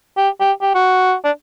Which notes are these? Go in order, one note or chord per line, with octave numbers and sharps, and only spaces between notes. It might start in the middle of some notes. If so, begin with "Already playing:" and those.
G4
G4
G4
F#4
D4